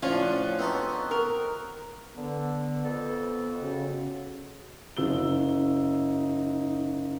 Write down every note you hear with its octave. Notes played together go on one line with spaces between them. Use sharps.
A2 F3 C#4 D4 F4
F#5
B3 C4 D#4 F#4 A4
A#4
D3 B3
F2 A4
C#3 F#4
F#1 D#4 E6 G7